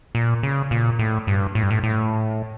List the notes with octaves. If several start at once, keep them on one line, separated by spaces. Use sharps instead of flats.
A#2
C#3
A#2
A2
G2
A2
G2
A2
A2